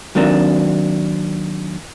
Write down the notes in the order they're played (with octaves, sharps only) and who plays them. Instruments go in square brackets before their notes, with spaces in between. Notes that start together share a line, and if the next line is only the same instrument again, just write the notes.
[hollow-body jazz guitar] D#3 F#3 A#3 C4 D4